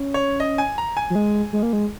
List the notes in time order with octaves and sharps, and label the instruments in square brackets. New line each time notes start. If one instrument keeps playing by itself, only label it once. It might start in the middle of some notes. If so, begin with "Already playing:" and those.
Already playing: [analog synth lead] C#4
[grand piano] C#5
D#5
G#5
A#5
G#5
[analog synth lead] F3
G#3
G#3
A#3
G#3